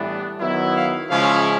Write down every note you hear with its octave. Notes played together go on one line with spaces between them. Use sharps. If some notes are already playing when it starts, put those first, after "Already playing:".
Already playing: A2 E3 G3 B3 D4
D#3 F#3 B3 E4
F5
C#3 F3 G#3 C#4 E4 F5